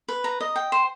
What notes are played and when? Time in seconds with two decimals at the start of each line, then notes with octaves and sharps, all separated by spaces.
0.08 B4
0.24 A#5
0.41 D#5
0.56 G5
0.72 C5